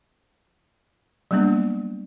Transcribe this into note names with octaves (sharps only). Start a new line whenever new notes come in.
F#3 G3 A#3 B3 D4